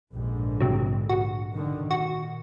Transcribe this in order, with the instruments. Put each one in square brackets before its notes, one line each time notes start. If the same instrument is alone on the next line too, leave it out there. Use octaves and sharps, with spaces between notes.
[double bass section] A#1 G#2 D3
[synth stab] C3 F#3
F#4
[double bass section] D3 D#3
[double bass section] A#2 [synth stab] F#4